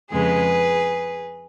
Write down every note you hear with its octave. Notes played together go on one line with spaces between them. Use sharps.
F2 C#3 G#3 G#4 B4